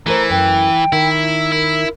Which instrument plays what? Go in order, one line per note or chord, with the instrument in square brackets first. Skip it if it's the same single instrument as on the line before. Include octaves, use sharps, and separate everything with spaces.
[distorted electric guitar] E3 [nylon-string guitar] A3 A#4 C5 [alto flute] A#5
[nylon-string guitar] F#2 [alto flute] G5
[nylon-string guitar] D#3 [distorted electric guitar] E4
[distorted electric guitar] E4 [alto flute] A#4